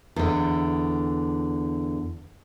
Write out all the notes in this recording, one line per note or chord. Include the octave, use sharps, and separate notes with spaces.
E2 D3